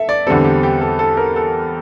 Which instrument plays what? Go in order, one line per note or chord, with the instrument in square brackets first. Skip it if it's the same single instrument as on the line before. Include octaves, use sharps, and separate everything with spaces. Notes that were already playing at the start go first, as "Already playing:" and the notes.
Already playing: [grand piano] A4 E5
D5
E2 D3 G3 C4 A4
G4
G4
A4
A4
A#4
A4